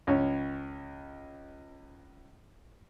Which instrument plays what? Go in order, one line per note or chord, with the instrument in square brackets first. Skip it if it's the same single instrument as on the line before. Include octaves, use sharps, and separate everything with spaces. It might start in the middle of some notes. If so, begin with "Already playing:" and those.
[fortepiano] C#2 C#4 C#5